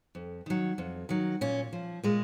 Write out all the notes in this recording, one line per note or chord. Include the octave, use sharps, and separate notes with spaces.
F2
D#3 F#3
F2
D#3 F#3
A#2 C#4
F3
A#2 G#3